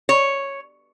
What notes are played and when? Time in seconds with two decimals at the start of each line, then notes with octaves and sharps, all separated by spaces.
0.09 C#5